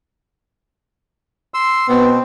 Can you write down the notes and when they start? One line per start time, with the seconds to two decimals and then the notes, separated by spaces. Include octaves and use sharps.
1.54 C6 E6
1.89 B2 B3 C4